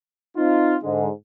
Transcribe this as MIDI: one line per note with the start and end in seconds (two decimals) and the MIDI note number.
0.36 0.76 60
0.36 0.76 63
0.36 0.76 65
0.84 1.08 44
0.84 1.08 50
0.84 1.08 56